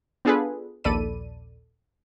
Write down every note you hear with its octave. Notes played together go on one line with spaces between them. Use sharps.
B3 D4 F4 G#4 A4 B4
A#1 D#2 A4 D5 B5 D#7